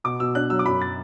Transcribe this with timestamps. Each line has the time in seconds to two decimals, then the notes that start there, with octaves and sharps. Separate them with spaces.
0.04 B2 D6
0.20 B2 E6
0.35 D4 F#6
0.50 F#3 E6
0.59 D6
0.66 F#2 B5
0.82 A6